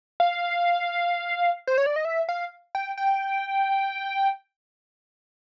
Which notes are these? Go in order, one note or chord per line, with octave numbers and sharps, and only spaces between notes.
F5
C5
C#5
D5
D#5
E5
F5
G5
G5